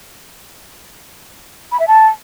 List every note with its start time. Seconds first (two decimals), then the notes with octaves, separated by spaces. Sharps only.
1.72 B5
1.80 E5
1.87 A5